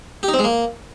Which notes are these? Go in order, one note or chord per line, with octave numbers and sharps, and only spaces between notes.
G4
D#4
C4
G#3
A#3